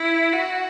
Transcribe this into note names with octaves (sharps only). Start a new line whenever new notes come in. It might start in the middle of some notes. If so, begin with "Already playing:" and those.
Already playing: E4
F#4